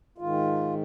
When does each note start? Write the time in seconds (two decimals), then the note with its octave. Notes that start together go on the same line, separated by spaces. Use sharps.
0.18 G#2 D#3 F4